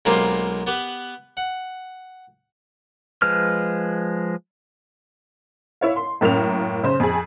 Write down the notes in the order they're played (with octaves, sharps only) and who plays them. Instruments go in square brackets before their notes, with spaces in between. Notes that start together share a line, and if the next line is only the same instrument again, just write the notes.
[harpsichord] B1 G#3 A#3 C4 F4 G4
B3 G4 B4
F#5
[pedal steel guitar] F3 G#3 B4 F6
[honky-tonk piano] E4 C#5 F5
C6
F#2 A2 A#3 C#4 F7
C#3 C5
F2 G#4